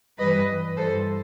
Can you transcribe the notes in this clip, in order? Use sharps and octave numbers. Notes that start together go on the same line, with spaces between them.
G2 E3 G3 B4 D#5
G2 E3 G3 A4 C5